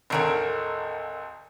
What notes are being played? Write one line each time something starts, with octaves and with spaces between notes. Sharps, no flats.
G#1 D2 A4 A#4 C#5